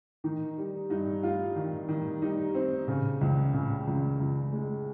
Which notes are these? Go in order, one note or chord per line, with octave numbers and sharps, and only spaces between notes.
D#3 D#4
G3
G2 D#4
G3 F4
D#3
D#3
G3 D#4
C4
C#3
C#2
C#3
C#2
C#2
G#3